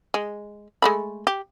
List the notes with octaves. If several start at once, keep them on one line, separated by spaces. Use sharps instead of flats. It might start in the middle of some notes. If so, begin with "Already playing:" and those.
G#3
G#3 A3 B5
G4